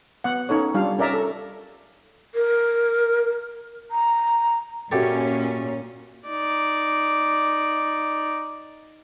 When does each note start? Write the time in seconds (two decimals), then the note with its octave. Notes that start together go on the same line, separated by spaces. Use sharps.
0.24 B3 F#5
0.49 C#4 D#4 A4 C#5
0.74 G3 D4 F4 F5
0.99 C#4 A#4 D5 E5 A#5
1.13 A4
2.35 A#4
3.91 A#5
4.92 F#2 A#2 C#4 G4 A4
6.29 D#4 D5